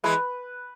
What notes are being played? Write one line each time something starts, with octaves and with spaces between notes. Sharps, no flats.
E3 G#3 B4